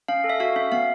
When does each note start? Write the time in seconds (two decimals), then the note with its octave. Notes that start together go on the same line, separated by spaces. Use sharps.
0.08 C#4 F5
0.24 A4
0.30 E5
0.40 F#4 F5
0.56 C#4 E5
0.72 B3 F5